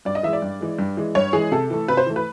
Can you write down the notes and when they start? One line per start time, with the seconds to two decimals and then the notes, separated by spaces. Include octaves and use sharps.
0.05 G2 D5
0.15 D#5
0.23 E3 G#3 E5
0.33 D5
0.42 G2
0.61 E3 G#3
0.79 G2
0.97 E3 G#3
1.15 G2 C#5
1.33 E3 G#3 G#4
1.52 C3 A4
1.70 E3 A3
1.88 C3 B4
1.97 C5
2.06 E3 A3
2.16 B4